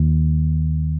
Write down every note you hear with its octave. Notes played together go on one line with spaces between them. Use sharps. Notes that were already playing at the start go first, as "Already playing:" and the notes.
Already playing: D#2